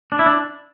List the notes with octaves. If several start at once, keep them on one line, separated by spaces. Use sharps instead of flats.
D4
E4
D4